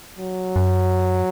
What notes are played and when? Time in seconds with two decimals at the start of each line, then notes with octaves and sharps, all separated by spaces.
0.19 F#3
0.56 F#2